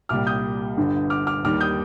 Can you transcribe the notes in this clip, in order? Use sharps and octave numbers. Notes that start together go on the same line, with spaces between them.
C2 A#2 G3 D6 F6
D#6 G6
G1 G2 D3
D6 F6
D6 F6
D#2 D#3 G3 D6 F6
D#6 G6